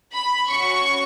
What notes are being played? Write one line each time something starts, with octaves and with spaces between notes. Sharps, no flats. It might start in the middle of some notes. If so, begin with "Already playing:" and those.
B5
C#4 F#4 C#6